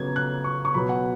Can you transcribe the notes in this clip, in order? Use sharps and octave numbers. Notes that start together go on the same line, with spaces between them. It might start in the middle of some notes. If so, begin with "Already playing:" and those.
Already playing: C#3 F#3 B3 G#6
F#6
C#6
C#6
B2 F#3 B3 B5
F#5